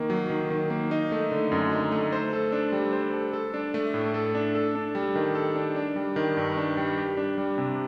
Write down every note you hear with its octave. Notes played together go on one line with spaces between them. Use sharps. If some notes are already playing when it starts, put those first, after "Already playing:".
Already playing: D#3 A#3
F#3
D#3
D#3
A#3
D#4
A3
D3
F#2
D#4
A3
C5
A4
D4
G3
C5
A4
A4
D4
A3
A2
A4
D4
A4
D4
G3
D#3
A4
D4
D4
G3
D#3
G2
D4
G3
G4
D4
G3
C3